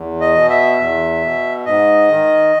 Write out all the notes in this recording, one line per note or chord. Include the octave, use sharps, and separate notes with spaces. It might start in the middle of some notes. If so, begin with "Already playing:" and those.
Already playing: E2
D#5
B2
E5
E2
B2
G#2 D#5
D#3